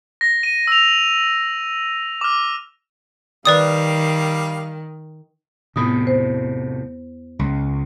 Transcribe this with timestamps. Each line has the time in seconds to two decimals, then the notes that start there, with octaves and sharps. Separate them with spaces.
0.21 A#6
0.43 D#7
0.67 E6 F7
2.21 D6 F6
3.45 D#3 G3 B4 D5 F5 D#6
5.76 E2 A2 C3 B3 D#6
6.07 C5
7.39 C#2